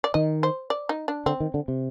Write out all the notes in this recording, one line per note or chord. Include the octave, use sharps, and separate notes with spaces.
D5
D#3 D#5
C5
D5
D#4
D4
D3 C4
D#3
D3
C3